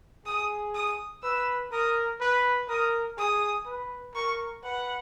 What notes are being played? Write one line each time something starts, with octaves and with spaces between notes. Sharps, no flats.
G#4 D#6
D#6
B4 E6
A#4 D#6
B4
A#4 D#6
G#4 D#6
B4
A#4 C#6
B4 F#5